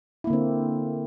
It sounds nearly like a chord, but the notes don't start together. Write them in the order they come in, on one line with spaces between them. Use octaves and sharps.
E4 A#3 D3 C4